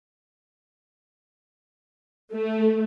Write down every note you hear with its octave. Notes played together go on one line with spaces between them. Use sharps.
A3